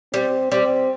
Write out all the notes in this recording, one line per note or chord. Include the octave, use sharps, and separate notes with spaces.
G3 C4
G3 C4